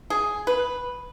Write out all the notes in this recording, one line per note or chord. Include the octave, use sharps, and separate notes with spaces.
G#4
B4